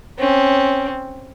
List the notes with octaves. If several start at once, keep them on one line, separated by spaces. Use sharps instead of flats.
C4 C#4